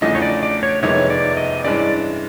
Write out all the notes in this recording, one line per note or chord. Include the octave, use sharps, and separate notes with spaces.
E2 C#3 F3 A3 D4 D#5
C#5
D5
D5
C#5
F2 C3 D#3 G#3 B3 C#5
D5
D#5
G2 E3 G#3 C#4 D5